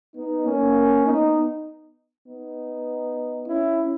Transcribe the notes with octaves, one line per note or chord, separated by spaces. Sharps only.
B3 D#4
A#3 C#4
B3 D#4
B3 D#4
C#4 E4